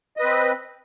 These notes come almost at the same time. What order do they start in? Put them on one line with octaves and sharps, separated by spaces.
D#5 B4 C4